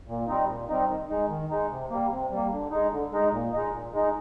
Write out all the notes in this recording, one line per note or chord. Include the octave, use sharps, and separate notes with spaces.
A#2
G3 C4 D#4
A#2
G3 C4 D#4
D#3
G#3 D#4
D#3
G#3 D#4
C3
G3 A#3
C3
G3 A#3
D3
G#3 D#4
D3
G#3 D#4
A#2
G#3 D#4
A#2
G#3 D#4